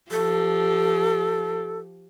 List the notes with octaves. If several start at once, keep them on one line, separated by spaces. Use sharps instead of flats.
F3 G4 A4